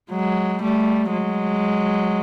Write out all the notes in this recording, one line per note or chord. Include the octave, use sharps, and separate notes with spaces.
F#3 G#3
G3 A3
F#3 G#3